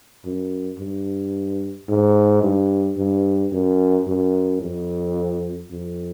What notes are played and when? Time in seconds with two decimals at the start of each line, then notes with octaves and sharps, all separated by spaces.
0.25 F#2
0.79 G2
1.88 G#2
2.42 G2
2.97 G2
3.52 F#2
4.07 F#2
4.61 F2
5.71 F2